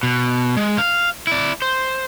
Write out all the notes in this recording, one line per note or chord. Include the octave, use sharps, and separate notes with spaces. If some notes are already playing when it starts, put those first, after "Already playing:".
B2
G#3
F5
E4 D5
C5